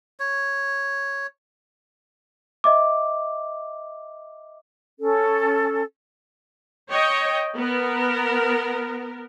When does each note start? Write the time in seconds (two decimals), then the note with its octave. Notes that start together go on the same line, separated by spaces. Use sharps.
0.20 C#5
2.64 D#5 E5 D6
5.00 C#4 A4
6.90 C#5 D#5 G5
7.56 B3 A#4